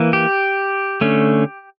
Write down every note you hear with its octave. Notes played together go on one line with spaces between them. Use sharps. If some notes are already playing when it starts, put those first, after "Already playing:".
Already playing: E3 A#3
G4
D3 A3 C#4